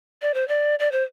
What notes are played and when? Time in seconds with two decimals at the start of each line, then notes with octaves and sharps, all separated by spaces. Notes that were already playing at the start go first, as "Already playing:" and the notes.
0.22 D5
0.34 C5
0.48 D5
0.79 D5
0.92 C5